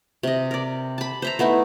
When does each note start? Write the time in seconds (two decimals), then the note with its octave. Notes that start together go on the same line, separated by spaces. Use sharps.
0.23 C3 D#5
0.51 A#4 D5
0.98 A5 B5
1.22 C5 E5 A#5
1.39 A3 B3 D#4 E4